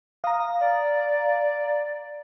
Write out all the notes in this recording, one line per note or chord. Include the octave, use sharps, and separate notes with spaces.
F5 A#5 D#6
D5